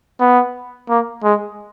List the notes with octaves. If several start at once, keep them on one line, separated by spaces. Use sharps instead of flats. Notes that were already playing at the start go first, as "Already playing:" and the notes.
B3
A#3
G#3